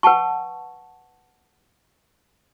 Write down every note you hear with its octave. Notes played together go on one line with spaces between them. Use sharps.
B4 F#5 G5 A5 C#6